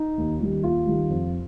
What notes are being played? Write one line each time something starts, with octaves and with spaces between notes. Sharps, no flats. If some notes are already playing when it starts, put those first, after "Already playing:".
Already playing: D#4
D#2
D#3 G3
D#2 F4
D#3 G3
F2